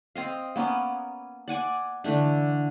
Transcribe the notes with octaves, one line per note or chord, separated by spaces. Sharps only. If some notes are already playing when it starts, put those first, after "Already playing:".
C4 D#5 F5
A#3 B3 C#4
D5 F#5 G#5 D6
D3 E3 A3 D4